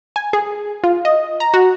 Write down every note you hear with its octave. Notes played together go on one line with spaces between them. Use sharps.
G#5
G#4
F4
D#5
A#5
F#4